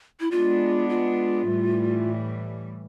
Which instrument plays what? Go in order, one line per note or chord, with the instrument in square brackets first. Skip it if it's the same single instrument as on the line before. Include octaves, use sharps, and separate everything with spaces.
[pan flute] E4
[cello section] G#3 B3 D4 [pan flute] F4
[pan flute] F4
[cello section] A2 E3 G3